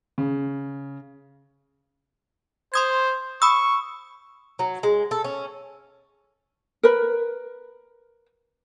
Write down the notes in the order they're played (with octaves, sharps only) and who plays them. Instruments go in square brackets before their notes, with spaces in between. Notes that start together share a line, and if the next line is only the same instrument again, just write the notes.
[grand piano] C#3
[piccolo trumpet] C5 [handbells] C6 D#6 G#6
[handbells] B5 D#6 E6 [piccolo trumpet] C#6
[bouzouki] F#3
G#3
A4
C#4
[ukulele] A#4 B4